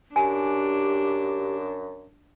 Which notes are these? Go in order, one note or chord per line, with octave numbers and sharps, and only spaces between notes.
F#2 D4 G4 G#5